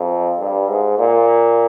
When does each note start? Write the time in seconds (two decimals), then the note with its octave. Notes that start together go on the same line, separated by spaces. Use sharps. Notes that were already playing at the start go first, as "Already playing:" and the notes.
Already playing: F2
0.40 G2
0.69 G#2
0.99 A#2